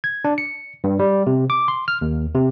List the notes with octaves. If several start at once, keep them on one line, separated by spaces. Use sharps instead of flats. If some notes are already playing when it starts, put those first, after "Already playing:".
G#6
D4
C#7
G2
G3
C3
D6
C6
F6
D#2
C3